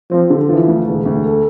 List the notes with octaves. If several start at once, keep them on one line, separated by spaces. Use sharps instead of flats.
F3 C4
D3
E3 F3
D2
E1
D2
A4